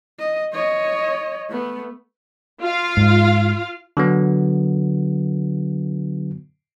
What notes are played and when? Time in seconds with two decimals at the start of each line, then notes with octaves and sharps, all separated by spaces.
0.19 D#5
0.53 C#5 D#5
1.49 A3 B3
2.60 F4 F5
2.97 G#2
3.97 D3 F#3 B3